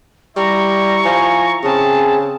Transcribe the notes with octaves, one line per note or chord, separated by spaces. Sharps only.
G3 E4 A#5 C#6
F3 G#5
C#3 C4 G#4 A5